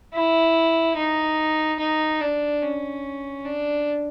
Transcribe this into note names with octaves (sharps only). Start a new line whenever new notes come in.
E4
D#4
D#4
D4
C#4
D4